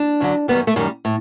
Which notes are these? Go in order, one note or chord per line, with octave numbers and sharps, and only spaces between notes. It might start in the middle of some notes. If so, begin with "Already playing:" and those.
Already playing: D4
F#2 D3 F#3
F#2 D#3 G3 B3
A3
F#2 D#3 G3 G#3
A2